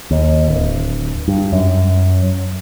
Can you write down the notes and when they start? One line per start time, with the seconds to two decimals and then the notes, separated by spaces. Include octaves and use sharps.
0.11 D#2
0.48 D1
1.28 G2
1.53 F#2